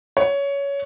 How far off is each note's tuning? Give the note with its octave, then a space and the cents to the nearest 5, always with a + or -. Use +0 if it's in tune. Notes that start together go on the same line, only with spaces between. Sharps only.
C#5 +15